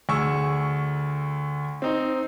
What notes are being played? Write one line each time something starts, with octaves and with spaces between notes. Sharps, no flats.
D2 G#4 C#6 E6
C4 D#4